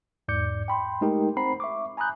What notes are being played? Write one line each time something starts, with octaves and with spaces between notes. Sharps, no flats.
E2 G#2 D5 D6 G6 C#7
G5 B5 C6
G#3 A3 D#4 G4 A#4 G5
C4 C5 F#5 A#5 B5 C7
E5 C#6 D6
G#5 A#5 B5 D#6 F#6 G6